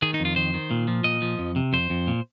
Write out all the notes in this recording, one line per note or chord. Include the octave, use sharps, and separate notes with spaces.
D#3 G#4
D#4
F2
F4
D#3 C5
D#3
A#2
F3
A#2 D#5
F3
F2
C3
F2 C5
F2
A#2